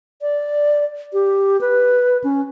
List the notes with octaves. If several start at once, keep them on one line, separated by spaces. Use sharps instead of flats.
D5
G4
B4
C#4